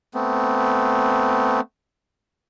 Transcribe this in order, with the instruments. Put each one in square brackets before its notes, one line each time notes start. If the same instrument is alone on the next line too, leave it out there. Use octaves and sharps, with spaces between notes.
[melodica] A3 B3 C4